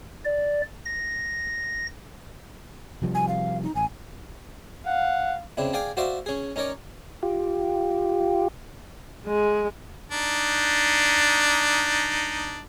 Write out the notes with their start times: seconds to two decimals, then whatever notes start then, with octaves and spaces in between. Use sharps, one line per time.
0.25 D5
0.86 A#6
3.02 C3 F3 G3
3.15 G#5
3.28 F5
3.63 D#4
3.75 A1 G#5
4.86 F5 F#5
5.57 C#3 C4 D4 E4
5.73 G#4 D5 F5 G5 G#5
5.97 F#4 C5 D5 E5 F5
6.26 C#4 G#4
6.56 C#4 D#4 A#4 C#5 D5
7.23 F4 G4
9.27 G#3
10.12 D4 D#4